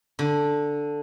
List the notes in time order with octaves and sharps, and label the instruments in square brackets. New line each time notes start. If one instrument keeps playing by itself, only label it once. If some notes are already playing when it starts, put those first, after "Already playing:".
[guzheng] D3